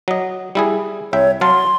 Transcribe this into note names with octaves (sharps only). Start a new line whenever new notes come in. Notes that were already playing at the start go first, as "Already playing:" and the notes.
F#3 D#5
G3 E4 G#4
C2 C#5 E5 G5
F#3 F5 A5 C6